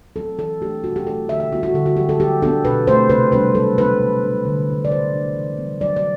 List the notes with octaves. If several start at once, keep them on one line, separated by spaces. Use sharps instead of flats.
F#3 C4 E4 A4
E3 A4
A3 D4 G4
B2 F#4
G4
F#3 A3 E4 A4
D3 E5
E5
G3 B3 E4 F#4
F#4
D3 A4
F#4
F#3 C4 E4 G4
A4
F#3 G4
B3 D4 A4
B2 B4
A3 C4 C5
C3 B4
G3 B3 D4 B4
F#3 A4
B3 D4 B4
C3
G3 D4
D3
G3 B3 E4
D5
F#3 C5
A3 D4
E3
G3 B3
F#3 D5
D5